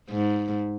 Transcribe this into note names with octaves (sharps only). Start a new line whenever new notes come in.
G#2